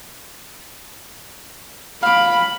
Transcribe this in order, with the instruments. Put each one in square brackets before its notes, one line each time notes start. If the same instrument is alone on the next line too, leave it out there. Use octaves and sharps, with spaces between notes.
[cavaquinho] F5 D6 [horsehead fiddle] B5